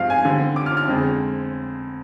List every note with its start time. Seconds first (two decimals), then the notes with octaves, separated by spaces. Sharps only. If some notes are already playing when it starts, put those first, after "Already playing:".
Already playing: G2 F3 G#3 C4 F5
0.10 G#5
0.25 D3 G3 C4
0.56 D6
0.66 F6
0.77 F6
0.88 F2 D3 G#3 C4